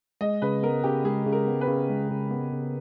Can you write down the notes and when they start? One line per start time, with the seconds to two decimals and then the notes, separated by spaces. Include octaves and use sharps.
0.21 G#3 D#5
0.42 C#3 B4
0.63 B3 A#4
0.84 C#3 G4
1.04 G#3 G#4
1.26 C#3
1.32 A#4
1.47 B3
1.61 B4
1.68 C#3
1.90 G#3
2.11 C#3
2.31 B3
2.52 C#3